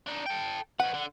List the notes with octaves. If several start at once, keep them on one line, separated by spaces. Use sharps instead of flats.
D4 D#4
A4 G5
F2 B4 F#5
D3